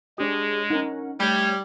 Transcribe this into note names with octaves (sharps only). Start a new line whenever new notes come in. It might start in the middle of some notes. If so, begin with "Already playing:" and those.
G#3 D4 G4 G#4 C#5 D#6
C#4 D#4 A#4 F#5
G3 A3 C#5